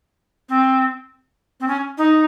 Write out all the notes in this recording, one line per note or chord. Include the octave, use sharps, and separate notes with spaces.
C4
C4
C#4
D#4